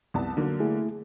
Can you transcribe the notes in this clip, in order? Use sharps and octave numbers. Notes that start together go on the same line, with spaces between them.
C2 B3 A5
D3 F#3 A#3
A3 E4 G#4